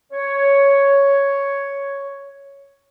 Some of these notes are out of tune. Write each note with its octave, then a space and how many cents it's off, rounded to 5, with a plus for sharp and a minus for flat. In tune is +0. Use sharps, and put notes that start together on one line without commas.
C#5 +5